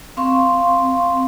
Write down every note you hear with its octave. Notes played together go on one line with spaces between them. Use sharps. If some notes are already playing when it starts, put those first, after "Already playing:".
C4 F5 C6 C#6